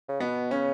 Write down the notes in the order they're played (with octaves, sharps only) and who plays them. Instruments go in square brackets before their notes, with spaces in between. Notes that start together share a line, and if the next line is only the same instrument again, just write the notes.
[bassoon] C#3
[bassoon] B2 [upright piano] B3
[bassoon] C#3 [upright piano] C#4